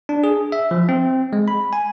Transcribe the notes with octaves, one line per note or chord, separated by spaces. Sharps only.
D4
G#4
E5
F3
C4
G#3
B5
G#5